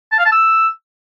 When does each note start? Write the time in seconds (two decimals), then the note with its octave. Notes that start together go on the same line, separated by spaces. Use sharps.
0.12 A5
0.19 F5
0.25 A5
0.32 E6